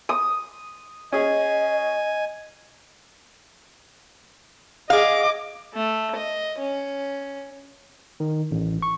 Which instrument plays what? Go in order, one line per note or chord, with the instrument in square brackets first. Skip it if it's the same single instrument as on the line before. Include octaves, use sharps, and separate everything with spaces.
[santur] D#6
[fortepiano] C#4 G#4 [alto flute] D#5 [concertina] G#5
[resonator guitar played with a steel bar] G#4 F5 [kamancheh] D#5 D6
[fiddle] A3
D#5
C#4
[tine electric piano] D#3
A1
C#6